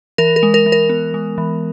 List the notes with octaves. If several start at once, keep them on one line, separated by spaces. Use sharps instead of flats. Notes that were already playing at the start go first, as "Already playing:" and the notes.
E3 A#4
A#4
G#3
A#4
E3
A#4
B3
G#3
E3